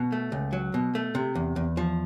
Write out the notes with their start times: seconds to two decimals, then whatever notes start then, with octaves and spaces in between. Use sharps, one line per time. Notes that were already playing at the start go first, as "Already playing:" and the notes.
Already playing: B2
0.12 A3
0.32 C#2
0.53 F#3
0.74 B2
0.95 A3
1.15 C3
1.35 E2
1.56 E2
1.77 F3